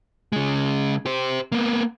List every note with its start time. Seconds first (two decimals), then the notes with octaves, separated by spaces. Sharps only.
0.32 C#3 G#3
1.06 G4 C5
1.52 A#3 B3